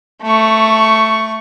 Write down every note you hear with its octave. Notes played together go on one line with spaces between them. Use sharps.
A3 C#6